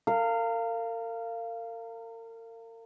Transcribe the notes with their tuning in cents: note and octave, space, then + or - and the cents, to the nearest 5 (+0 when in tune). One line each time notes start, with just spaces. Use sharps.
A#4 -40 F5 -15